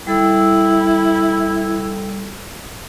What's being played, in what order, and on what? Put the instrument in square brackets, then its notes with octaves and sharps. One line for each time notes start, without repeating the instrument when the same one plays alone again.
[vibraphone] G3 A4 E6 [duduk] E4